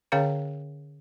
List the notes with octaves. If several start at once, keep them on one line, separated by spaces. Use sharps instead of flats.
D3 C#4 G#4 C#5 F5 G5